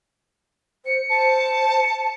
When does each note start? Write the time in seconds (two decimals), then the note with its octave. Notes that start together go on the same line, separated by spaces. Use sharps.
0.85 C5 C#7
1.10 C5 A5